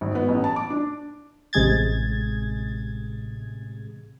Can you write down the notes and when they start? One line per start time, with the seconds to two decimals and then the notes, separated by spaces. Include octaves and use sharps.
0.01 G#1
0.15 B3
0.28 A1
0.44 A5
0.56 D6
0.70 D4
1.53 A1 C3 G#3 G#4 G#6 A6